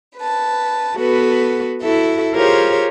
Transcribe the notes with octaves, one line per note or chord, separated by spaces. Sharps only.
B4 A5
B3 F#4 A4 B4
E4 F#4 A4 E5
F4 G4 G#4 A#4 C5 C#5